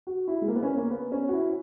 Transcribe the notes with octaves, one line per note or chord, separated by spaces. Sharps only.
F#4
E4
G#3
A#3
B3
C#4
A#3
B3
C#4
F#4
E4